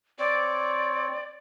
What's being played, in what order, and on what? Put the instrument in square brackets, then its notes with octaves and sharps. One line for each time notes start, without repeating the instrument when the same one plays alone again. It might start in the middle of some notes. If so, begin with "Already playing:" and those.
[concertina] C4 C#5 [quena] D5